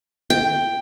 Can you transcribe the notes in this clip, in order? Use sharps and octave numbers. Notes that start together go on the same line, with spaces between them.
G5